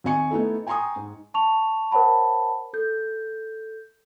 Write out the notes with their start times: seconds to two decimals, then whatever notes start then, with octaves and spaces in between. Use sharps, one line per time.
0.04 D#2 C4 D#5 G#5 C#6 C#7
0.31 A3 B3 D#4 E4 A4
0.67 G5 G#5 A#5 C6 C#6 D#6
0.96 G#2
1.34 A5 C#6 F7
1.91 A#4 C5 C#5 F#5 A5 B5
2.73 A4 G6